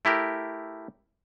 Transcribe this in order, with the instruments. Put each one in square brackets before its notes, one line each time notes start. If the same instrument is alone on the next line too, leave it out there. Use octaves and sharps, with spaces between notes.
[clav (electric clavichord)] A3 E4 G4 A#4